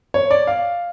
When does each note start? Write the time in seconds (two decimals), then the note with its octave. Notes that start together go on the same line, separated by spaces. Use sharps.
0.14 C#5
0.31 D5
0.47 F5